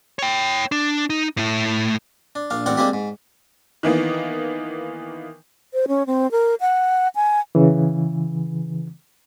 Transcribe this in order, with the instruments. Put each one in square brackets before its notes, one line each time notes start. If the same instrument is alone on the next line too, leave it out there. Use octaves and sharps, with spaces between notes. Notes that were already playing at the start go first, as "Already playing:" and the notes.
[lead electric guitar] C#5 G5
D4
D#4
A2 A3
[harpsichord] D4
A#1 D4 F5
A1 C4 D4 A#4 F#5
G3 G#3 A#3 C4 D4 G4
G#2
[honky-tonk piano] D#3 E3 A#3 B3
[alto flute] C5
C#4
C4
A#4
F#5
G#5
[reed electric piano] C#3 E3